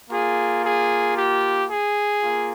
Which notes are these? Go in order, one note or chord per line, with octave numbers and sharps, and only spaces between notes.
A#3 F4 G#4
G#4
G4
G#4
A#3 F4